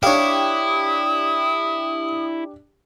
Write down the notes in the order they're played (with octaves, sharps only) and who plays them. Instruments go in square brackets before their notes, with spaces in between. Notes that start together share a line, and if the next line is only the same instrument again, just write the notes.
[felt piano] D4 G4 [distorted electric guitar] E4 [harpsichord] C#5 F5 [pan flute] D#6